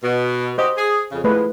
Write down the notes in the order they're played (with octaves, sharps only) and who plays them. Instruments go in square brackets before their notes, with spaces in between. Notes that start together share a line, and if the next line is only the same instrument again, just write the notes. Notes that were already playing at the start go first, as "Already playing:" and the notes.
[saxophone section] B2
[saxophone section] F#4 G4 [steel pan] C5 D#5
[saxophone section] G#4
F2 C#3
[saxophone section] E3 F3 G#3 [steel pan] A3 B4